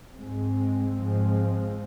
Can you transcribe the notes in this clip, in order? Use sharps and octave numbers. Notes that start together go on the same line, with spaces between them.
G#2 G#3 C4
G#2 F3 G#3 C4